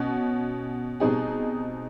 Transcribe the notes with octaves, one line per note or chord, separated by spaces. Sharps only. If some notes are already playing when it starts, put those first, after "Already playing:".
Already playing: B2 C#4 F#4
B2 G3 C4 D#4 G#4